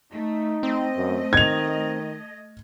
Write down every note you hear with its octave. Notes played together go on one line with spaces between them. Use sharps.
A3 D#4
A3 C4 D#5
F#2
D#3 G#6 F7